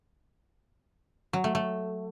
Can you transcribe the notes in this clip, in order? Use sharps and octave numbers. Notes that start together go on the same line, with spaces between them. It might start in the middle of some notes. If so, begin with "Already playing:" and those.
F#3
A3
A3